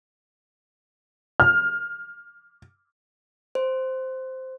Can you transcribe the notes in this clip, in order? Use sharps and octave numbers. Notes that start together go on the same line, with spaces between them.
F6
C5